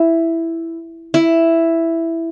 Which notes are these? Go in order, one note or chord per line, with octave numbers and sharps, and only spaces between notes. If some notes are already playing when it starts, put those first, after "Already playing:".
Already playing: E4
E4